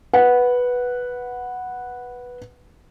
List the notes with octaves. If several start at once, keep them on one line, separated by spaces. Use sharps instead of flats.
B4 F#5